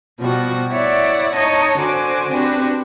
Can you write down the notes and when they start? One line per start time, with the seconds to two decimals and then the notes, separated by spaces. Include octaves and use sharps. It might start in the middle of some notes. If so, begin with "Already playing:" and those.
0.19 B2 F3 G3 F#4
0.70 E4 C#5 D5 E5 F#5
1.34 D#4 C#5 D#5 A5
1.77 D3 F#4 C5 G#5 D6
2.30 C4 D4 F#4 G4 B4